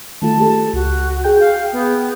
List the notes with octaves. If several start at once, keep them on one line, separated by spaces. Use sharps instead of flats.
D#3 A3 F4 A5
A3 G4 A4
C#2 F#4
G#4 G5 G6
F5
B3